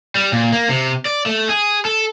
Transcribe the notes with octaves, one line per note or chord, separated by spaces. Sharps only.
G3
A#2
A#3
C3
D5
A3
G#4
A4